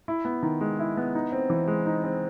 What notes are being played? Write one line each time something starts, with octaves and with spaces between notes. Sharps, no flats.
E4
B3
D#3
G#3
E4
B3
D#4
C4
E3
G#3
D#4
C4